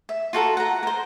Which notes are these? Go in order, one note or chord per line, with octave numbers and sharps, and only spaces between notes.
E5
F4 F#4 A4 A#5
F#5 A#5
A#4 C5